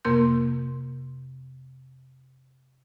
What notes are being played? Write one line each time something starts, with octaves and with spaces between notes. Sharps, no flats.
F2 C3 A#3 A#4 C6 G6